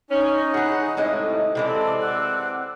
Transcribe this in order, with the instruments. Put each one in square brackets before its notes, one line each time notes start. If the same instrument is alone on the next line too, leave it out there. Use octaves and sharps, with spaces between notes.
[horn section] C#4 [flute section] D#4
[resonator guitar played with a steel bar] E3 G#4 [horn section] F#5
[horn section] A2 C3 G3 [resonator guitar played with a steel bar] G#3 E4 D#5
[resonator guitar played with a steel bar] C3 E3 G#3 [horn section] C4 D5 [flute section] A4
[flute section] F#5 E6 F#6